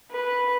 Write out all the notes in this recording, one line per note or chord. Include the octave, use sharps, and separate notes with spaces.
B4